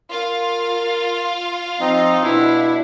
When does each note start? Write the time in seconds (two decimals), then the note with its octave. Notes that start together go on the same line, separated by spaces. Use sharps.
0.11 F4 A#4 F5
1.80 F3 C4 D#4 D#5
2.23 B2 D4 E4